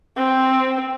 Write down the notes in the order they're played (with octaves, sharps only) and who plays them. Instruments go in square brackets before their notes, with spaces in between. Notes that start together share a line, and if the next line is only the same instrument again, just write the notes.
[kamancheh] C4